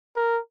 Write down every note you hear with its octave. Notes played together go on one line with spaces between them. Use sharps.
A#4